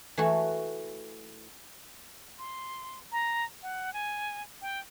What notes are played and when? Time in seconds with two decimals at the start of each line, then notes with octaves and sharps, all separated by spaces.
0.18 E3 A3 F#4
2.39 C6
3.12 A#5
3.63 F#5
3.93 G#5
4.62 G5